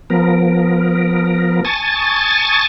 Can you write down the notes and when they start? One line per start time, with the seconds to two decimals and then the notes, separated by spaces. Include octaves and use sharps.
0.10 F3 B3 A#4
1.65 G#5 A5 C#6 D#6 A6